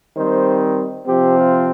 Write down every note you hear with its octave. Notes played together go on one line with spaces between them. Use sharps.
D#3 G3 C4 C5
C3 F3 C4 G4
F4